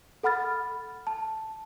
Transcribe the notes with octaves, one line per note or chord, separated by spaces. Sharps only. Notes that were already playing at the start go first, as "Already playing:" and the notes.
A4 F#5 B5 F6 A6
A5